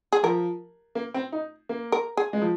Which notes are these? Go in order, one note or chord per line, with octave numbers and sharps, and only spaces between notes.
G#4
F3 A#4
A#3
C4
D#4
A#3
A#4
G#4
G#3
F3